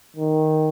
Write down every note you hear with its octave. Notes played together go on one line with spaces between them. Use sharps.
D#3